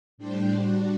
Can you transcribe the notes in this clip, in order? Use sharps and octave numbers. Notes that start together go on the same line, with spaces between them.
A2 G3 D4 G4 C5
G3 D4 F#4